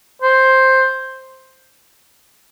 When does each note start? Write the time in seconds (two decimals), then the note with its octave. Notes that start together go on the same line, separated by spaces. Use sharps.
0.22 C5